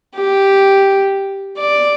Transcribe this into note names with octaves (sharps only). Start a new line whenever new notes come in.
G4
D5